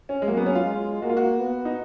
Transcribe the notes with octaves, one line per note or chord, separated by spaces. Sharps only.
C#4
G#3
F#3 A#3
B3
C#4
F4
G#3
A#3 F#4
F4
F#4
B3
D#4